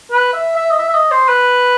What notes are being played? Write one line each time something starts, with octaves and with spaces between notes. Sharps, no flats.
B4
E5
E5
D#5
E5
E5
D#5
C5
B4